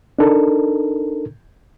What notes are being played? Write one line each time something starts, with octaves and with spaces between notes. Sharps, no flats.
D4 D#4 A4 A#4